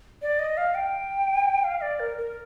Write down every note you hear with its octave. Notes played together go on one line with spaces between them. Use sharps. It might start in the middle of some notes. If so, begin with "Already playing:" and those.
D5
D#5
F5
G5
F5
D5
A#4
A#4